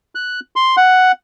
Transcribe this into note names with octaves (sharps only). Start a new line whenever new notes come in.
F#6
C6
F#5